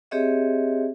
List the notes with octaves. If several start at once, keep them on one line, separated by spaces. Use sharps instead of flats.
C4 G4 G#4 C#5 D#5 E5